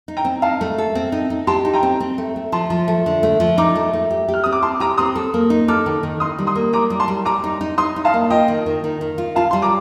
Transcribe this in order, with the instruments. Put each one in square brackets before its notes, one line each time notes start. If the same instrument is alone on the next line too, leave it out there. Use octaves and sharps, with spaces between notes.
[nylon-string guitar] D#4
[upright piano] G5 A#5
[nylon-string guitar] C4
[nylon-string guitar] D#4 [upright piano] F5 A5
[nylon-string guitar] A3
A4
C4
D#4
D#4
[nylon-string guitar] G4 [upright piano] A5 C6
[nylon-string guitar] D#4
[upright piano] G5 A#5
[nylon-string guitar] C4
C4
A3
A3
[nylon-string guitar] F3 [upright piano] A5 C6
[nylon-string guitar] F3
A3
D3
A3
F3
[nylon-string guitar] D#4 [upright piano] A#5 D6
[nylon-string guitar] A3
A3
G4
G4
[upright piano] F6
[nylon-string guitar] C4 [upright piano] D#6
[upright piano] D6
[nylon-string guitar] C4 [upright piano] A5 C6
[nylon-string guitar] G4 [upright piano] A#5 D6
[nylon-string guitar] C4 [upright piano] C6 D#6
[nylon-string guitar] A4
A#3
D#4
[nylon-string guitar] A4 [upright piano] D6 F6
[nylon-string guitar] D#3
D#3
[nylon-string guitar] D#4 [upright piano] C6 D#6
[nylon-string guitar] G3
[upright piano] C6 D#6
[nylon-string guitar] A#3
[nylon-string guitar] G3 [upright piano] A#5 D6
[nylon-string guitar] G3
[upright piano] A5 C6
[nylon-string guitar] G3
[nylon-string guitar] G3 [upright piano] A#5 D6
[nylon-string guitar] D#4
D#4
[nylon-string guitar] D#4 [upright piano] C6 D#6
[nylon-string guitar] D#4
[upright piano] F5 A5
[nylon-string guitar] A#3
[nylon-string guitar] F4 [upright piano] D#5 G5
[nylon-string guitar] D#3
D#3
D#3
D#3
F4
[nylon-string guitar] F4 [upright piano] F5 A5
[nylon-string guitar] G3 [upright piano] C6
[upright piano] A#5 D6